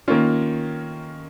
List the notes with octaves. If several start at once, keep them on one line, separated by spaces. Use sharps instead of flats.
D#3 A#3 C#4 F4